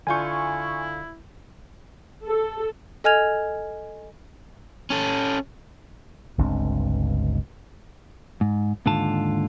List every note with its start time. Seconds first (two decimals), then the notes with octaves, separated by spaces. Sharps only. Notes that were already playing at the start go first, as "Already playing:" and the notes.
0.07 D3 E4 F4 G#5 C#6 G6
2.25 A4
3.04 A4 D#5 G#5 F6 G#6 F7
4.90 C#4 A4
6.38 G1 C#2 C4 D4
8.41 G#2
8.86 D#2 G#2 D3 F4 A5